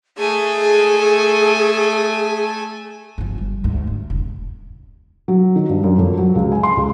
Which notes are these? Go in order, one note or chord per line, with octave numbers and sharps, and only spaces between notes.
A3 G#4 G#5
G1 F3
G3
D2 G#2
G2
E1 C2
F#3
D#3
G2
F#2
F2
F#3
C#2
G#5
C6
C#2